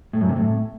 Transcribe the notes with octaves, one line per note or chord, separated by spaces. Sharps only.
A2
F#2
C3
A2